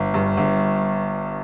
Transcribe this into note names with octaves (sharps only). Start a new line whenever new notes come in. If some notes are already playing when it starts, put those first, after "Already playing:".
Already playing: G1
G2
G1